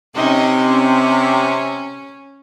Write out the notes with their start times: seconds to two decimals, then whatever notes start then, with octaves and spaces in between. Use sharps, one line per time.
0.14 C3 C#4 D#4
0.67 C#4